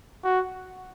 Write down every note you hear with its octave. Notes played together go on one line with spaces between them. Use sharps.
F#4